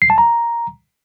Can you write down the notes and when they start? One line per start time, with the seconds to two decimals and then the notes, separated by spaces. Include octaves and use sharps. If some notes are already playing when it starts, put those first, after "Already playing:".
0.02 C7
0.10 A5
0.18 A#5